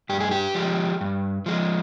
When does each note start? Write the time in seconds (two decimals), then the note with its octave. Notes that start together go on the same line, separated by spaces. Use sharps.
0.09 G2 G4
0.20 G#4
0.31 G4
0.55 F3 G#3
1.01 G2
1.46 F3 G#3